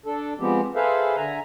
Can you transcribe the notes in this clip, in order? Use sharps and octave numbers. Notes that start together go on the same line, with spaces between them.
D4 A4
F3 G#3 B3 C4 G4
G#4 A4 B4 C5 E5 F5
D3 E5 G#5 A#5